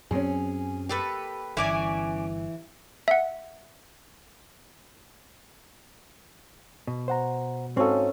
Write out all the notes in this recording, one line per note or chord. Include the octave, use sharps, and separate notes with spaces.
F#2 F#3 C4 C#4 G#4
A#3 G4 A4 B4
G1 E3 C#4 D5 G#5
E5 F#5
B2
C5 F#5 A#5
G#2 C4 C#4 D#4 F#4 A4 F5